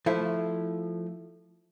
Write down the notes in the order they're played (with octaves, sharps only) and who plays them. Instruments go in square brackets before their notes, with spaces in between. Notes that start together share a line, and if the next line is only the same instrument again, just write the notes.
[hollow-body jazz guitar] F3 A3 E4